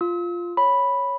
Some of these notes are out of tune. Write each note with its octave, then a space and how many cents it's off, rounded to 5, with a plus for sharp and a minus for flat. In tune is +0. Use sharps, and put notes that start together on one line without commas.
F4 +0 E6 -40
C#5 +0 B5 +0